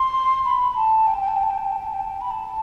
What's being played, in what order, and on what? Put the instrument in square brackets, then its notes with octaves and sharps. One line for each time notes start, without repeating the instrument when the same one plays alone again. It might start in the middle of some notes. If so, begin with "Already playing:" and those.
Already playing: [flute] C6
B5
B5
A5
G5
A5
G5
A5
G5
A5
G5
A5
G5
A5
G5
A5
G5
A5
G5
B5
A5